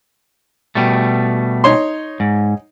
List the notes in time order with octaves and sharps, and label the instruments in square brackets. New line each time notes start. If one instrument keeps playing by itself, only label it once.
[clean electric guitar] B2 G3 A3
[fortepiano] D#4 C#5 C6
[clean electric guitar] G#2